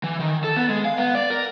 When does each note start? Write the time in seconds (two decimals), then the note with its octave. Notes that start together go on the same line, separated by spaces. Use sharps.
0.04 E3
0.20 D#3
0.44 A4
0.57 B3
0.69 G#3
0.85 F5
0.98 B3
1.15 D5
1.30 A#4